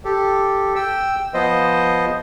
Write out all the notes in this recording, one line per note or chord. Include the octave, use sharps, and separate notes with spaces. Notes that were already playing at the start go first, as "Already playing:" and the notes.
G4 A4
G5 E6
F3 B3 C5 D#5